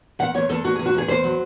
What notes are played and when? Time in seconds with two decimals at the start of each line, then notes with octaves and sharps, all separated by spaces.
0.19 E2 F#5
0.34 E2 C#5
0.49 E2 A4
0.64 E2 F#4
0.76 G#4
0.79 E2
0.86 F#4
0.94 E2 G#4
1.08 E2 C5
1.24 F#3